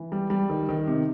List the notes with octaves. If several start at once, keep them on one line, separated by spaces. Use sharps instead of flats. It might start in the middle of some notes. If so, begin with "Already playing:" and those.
Already playing: E3
G3
G3
D#3
D#3
C3